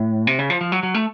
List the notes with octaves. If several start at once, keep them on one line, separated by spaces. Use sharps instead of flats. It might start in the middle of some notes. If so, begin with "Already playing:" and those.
Already playing: A2
C3
C#3
F3
F3
F#3
F#3
A3